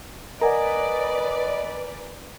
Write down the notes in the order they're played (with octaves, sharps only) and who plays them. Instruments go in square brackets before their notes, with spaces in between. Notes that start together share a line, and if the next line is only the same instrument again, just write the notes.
[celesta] A#4 F#5 [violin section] B4 D5 [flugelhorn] D#5 [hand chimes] G#5 A#5